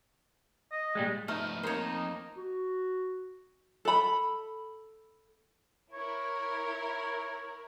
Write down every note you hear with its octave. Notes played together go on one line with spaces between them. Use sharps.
D#5
A#2 G3 G#3
F3 A3 B3 D#4 F6
F2 A#3 D#4 C5 C#5
F#4
A4 B5
E4 A#4 C#5